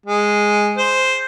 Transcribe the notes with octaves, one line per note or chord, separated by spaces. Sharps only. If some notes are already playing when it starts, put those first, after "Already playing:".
G#3
C5